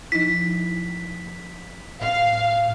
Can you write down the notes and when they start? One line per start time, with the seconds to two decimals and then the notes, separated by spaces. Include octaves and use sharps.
0.12 F3 D#4 E4 B6
2.01 A2 F5